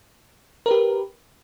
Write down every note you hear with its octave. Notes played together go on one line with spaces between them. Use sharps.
G4 A#4 B4